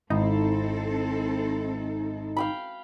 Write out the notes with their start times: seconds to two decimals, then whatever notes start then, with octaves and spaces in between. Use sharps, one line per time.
0.10 G#1 C4 D#4 E4 A4
2.37 F5 G5 B5